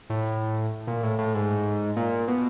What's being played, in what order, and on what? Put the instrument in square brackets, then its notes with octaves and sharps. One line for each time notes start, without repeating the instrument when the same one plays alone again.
[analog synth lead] A2
A#2
A2
A2
G#2
A#2
B2